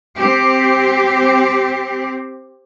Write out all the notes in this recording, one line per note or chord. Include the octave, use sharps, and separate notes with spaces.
C4 G4